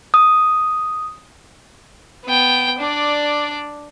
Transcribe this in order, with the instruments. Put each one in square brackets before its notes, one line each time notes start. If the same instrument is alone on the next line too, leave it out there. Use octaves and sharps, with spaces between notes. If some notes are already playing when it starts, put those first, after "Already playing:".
[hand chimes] D#6
[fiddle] B3 G5
D4 D5